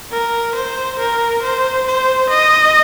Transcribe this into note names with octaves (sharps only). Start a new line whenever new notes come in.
A#4
C5
A#4
C5
C5
D#5